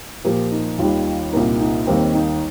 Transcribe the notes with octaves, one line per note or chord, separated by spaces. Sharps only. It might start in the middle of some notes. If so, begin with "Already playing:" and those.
A#2 F3 A#3 G4
D#4
D#2 D#3 G3 F4
C2 A#2 G3 A#3 D#4
D#4
D#2 D#3 G3 A#3 C4
D#4